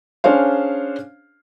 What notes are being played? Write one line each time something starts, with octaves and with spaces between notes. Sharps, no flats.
C#4 D4 G#4 C5 C#5 F5